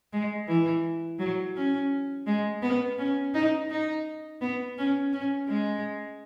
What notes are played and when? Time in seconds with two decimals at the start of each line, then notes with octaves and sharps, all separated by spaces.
0.13 G#3
0.48 E3
1.19 F#3
1.56 C#4
2.27 G#3
2.62 B3
2.98 C#4
3.34 D#4
3.70 D#4
4.41 B3
4.78 C#4
5.13 C#4
5.49 G#3